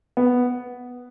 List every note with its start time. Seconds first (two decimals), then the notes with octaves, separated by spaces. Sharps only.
0.17 B3